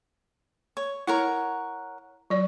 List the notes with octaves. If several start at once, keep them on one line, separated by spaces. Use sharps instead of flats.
C#5
E4 A#4 C#5 F#5
F#3 D5